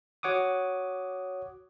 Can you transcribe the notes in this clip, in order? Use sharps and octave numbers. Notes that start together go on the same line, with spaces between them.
F#4 C#5 F#5 D6 D#6